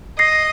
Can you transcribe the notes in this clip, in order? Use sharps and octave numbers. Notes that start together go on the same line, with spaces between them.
D#5 A#6 C7